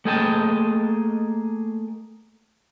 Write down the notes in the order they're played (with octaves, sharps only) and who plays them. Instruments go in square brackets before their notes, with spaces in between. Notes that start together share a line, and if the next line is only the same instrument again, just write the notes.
[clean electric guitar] A3 A#3 G#4 D#5 G5 A5